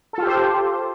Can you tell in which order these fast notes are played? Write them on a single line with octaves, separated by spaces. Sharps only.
A4 F4 G4 C5